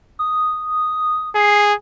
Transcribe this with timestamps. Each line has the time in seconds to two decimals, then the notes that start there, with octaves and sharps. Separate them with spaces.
0.19 D#6
1.35 G#4 C7